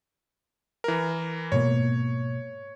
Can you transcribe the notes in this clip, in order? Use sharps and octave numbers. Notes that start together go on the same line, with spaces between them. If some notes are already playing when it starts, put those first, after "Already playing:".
E3 A#4
G#2 B2 A#3 C#5